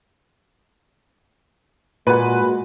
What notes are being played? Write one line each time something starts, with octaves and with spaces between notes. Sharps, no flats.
A#2 G#3 F#4 B4 F#5